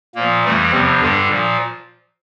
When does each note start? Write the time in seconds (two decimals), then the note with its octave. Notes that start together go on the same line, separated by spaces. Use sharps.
0.15 A#2 F3 A#3
0.44 F2 E3 G3 A3
0.72 E2 C3 F3 C4
1.00 G2 D3 G3 D4
1.29 A#2 F3